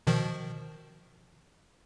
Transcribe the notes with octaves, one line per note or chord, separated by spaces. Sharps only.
B2 D#3 F3